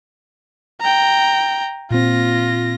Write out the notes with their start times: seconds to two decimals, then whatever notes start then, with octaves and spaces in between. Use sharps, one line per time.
0.80 G5 A#5
1.91 A#2 C4 F4 A#6